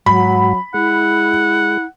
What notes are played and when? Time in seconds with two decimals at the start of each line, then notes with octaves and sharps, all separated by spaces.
0.06 G#2 F#3 F#4 B5
0.74 G#3 E4 F#5